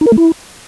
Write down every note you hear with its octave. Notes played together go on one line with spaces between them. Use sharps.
D#4
A#4
A3
E4